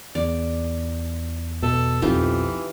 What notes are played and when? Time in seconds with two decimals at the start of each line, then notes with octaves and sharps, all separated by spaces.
0.15 E2 D5
1.63 B2 A4
2.02 B1 F2 E3 D#4 F4 G4